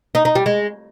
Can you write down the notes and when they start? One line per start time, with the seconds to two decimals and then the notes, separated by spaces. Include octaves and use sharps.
0.15 D#4
0.25 D#4
0.35 G3
0.46 G#3